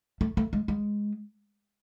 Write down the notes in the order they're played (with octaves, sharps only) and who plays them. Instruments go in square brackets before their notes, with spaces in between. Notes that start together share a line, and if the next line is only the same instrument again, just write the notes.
[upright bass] A3
A3
G#3
G#3